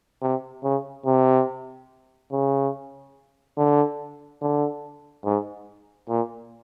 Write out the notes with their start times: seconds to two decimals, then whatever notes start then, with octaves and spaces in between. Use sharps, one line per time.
0.22 C3
0.64 C#3
1.06 C3
2.32 C#3
3.58 D3
4.42 D3
5.25 G#2
6.09 A#2